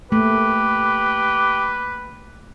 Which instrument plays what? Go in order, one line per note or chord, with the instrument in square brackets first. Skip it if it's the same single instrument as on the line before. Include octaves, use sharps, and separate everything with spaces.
[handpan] A3 A#3 [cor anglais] G4 [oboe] B4